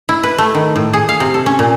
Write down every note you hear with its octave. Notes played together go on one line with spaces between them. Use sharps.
E4
B4
A3
D#3
A2
G#4
F5
C3
A4
C#4
A#2